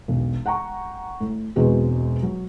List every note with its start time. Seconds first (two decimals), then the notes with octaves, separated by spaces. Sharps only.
0.08 E1 B1
0.46 F#5 G5 A#5 C#6
1.21 A2
1.56 E1 E2 G#3 C4 F#4 B4
2.23 F#3